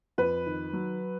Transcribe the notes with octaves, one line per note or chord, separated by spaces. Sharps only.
F2 B4
D#3
F#3